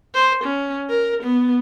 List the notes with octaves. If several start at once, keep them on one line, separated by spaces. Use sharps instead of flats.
C5
C#4
A#4
B3